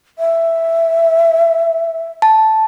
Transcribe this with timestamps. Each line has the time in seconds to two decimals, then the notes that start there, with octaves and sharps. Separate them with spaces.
0.19 E5
2.22 A5